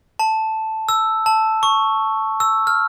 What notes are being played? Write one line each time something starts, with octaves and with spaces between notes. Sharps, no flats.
A5
E6
A5
C#6
E6
F6